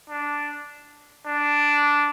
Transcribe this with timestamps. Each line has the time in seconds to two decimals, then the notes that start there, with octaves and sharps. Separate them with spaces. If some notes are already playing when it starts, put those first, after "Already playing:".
0.10 D4
1.27 D4